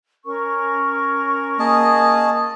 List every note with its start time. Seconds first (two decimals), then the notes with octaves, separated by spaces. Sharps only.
0.25 C#4 A#4 C#6
1.60 A#3 G#4 D#5 A5